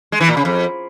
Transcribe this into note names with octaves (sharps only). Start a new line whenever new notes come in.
G#3
E3
A#2
C#3
F2